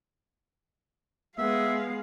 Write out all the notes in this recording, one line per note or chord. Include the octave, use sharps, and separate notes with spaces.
G#3 B3 E5 F5